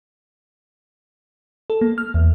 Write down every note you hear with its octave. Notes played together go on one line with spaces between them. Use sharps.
A4
A#3
F6
E2